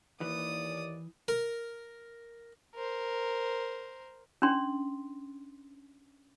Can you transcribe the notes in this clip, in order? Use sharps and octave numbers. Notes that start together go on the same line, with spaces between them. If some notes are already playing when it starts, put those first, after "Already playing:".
D#2 E3 D5 D#6
A#4
A#4 C5
C#4 D4 C6